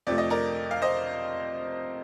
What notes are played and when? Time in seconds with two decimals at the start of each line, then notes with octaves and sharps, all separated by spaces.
0.07 F2 C3 F3 A3 D5
0.18 D#5
0.30 A#4 D5
0.71 F5
0.82 C5 D#5